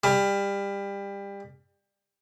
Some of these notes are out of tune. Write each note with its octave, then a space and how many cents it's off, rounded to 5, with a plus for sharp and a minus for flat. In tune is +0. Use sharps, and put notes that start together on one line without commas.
G3 +25